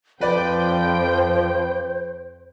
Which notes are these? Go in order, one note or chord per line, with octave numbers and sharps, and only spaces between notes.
F2 F3 B4 C5 D5 G5